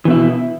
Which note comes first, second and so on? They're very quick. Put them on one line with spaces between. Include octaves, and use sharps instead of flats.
E3 B2 E4